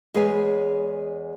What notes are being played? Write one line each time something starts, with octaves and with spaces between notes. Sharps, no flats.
E2 G#3 G#4 B4 C#5 G#5